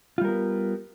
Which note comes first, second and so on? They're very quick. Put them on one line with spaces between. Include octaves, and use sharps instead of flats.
F4 G3 A#4 B3